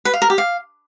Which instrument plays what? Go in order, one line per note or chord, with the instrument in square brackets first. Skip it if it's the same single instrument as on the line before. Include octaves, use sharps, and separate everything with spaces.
[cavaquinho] B4
F5
A#4
G4
F5